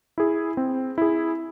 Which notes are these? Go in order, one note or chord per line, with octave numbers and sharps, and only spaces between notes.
E4 G#4
C4
E4 G#4